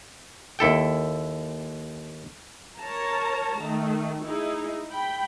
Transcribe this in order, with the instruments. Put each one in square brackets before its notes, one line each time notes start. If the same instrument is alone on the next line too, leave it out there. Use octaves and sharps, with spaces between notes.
[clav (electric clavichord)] D#2 E4 A4 G5
[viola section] A#4 C#5 A5 A#5
D#3 A3
D#4 E4 G#4
G5 B5